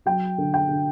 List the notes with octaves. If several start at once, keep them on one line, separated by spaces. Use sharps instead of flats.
F#3 G5
D3
G5
D3